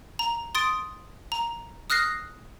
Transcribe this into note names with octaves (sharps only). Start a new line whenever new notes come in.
A#5
C6 D#6 A6 D7
A#5
D#6 F6 F#6 A#6 C7